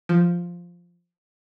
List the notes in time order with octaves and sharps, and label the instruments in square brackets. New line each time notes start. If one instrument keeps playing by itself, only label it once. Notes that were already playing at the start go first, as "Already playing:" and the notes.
[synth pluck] F3